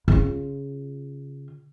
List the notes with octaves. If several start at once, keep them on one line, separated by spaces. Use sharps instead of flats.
C#3 F4